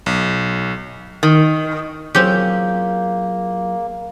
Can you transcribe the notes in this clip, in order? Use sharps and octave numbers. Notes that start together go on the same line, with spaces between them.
B1
D#3
F#3 A#3 C4 C#4 F4 G4 G#4